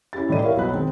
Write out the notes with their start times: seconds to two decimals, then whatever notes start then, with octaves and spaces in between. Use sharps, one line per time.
0.13 C#4 E4 G4 A6
0.29 A2 E3 D#4 D5 D#7
0.42 E4 G4 A#4 C#5 E5 F5
0.57 B1 F#3 B3 B5 F#6
0.73 D#3 G#3 C4